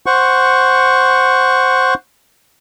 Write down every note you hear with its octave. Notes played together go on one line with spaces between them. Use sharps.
C5 F#5 C#6